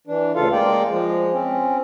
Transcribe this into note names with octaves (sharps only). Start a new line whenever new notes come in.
E3 D4
D2 C#3 F4 A4 F5
G#3 A#3 D5 G5
F3 G#3
C4 C#4